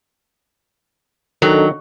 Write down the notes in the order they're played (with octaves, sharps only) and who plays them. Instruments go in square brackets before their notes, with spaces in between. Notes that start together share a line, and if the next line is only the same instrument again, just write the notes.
[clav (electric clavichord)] D#3 [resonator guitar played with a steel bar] F#3 [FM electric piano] D4 A4 D#5